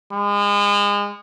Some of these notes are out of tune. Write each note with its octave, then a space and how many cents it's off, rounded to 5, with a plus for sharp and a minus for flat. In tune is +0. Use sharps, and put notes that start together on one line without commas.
G#3 -30